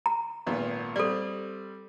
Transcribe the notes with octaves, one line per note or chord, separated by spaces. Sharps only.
A#5
G#1 A#2 B3
G3 C4 A4 D5